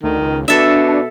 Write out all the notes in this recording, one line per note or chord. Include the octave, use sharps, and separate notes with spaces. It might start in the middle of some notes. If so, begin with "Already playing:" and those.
D2 D#3
C#2
B2 D4 A4 E5